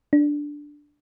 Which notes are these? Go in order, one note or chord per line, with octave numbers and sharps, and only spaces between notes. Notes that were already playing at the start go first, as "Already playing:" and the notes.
D4